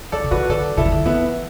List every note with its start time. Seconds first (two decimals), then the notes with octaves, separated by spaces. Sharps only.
0.12 E3 A4 D5
0.24 D3
0.31 E3 F#4 B4
0.49 D3 A4 D5
0.77 D3 E4 A4
0.85 E3
0.92 D3
1.05 E3 B3 E4